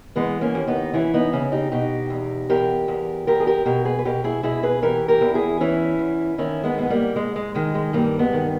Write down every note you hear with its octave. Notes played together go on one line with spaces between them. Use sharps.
E3 G#3 B3
A#3 C#4
D#2
B3 D#4
E3 C#4 E4
B3 D#4
C#3 C#4 E4
D#4 G4
B2 D#4 G4
E2
E2 G4 A#4
E2
E2 G4 A#4
G#4
G4 A#4
B2 G4 A#4
G#4 B4
B4
B2 G4 A#4
E4 G#4
B2 E4 G#4
G#4 B4
E3 G4 A#4
G4 A#4
E2
E4 G#4
E3 C#4 E4
E2
D#3 C#4 E4
G#3 B3
G#2 B3
G3 A#3
G#2 G#3
G#3
D#3 G#3
G#3
G2 G3 A#3
G#3 B3
D#3